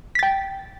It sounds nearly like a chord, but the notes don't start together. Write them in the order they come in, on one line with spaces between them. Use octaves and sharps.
B6 A6 G5